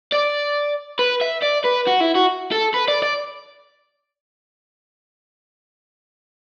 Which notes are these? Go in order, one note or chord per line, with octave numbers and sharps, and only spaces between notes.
D5
B4
E5
D5
B4
F#4
E4
F#4
A4
B4
D5
D5